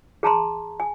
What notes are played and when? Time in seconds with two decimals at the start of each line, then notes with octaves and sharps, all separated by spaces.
0.23 G#4 A5 A#5 C6
0.80 G#5